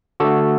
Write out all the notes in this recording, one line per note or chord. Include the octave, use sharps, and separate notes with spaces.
D3 A3 F#4 A4